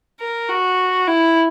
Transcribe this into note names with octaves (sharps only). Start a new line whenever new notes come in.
A#4
F#4
E4